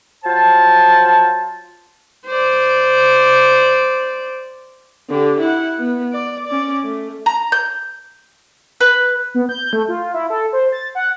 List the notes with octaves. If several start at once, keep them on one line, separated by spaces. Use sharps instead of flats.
F#3 F4 C5 A5
C5 D5
D3 G4
E4 F#5
B3
D5
C#4 D5
A3
A#5
G6
B4
B3
G6
A3
F4
E4
A4
C5
A6
F#5